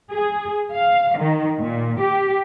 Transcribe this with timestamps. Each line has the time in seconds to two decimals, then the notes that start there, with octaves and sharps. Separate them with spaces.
0.11 G#4
0.73 F5
1.17 D#3
1.59 A#2
2.00 G4